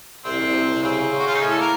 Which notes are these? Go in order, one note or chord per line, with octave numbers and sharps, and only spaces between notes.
C2 C4
C2
C3
C2
C#3 C4
C#3
C#3
F#4
C#3 F4
D#4
A2 C#4
A4
A#3 A#4